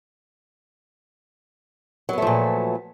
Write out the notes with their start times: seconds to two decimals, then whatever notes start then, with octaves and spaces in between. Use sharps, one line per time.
2.09 F#3
2.13 B3
2.18 A3
2.22 F3
2.27 A#2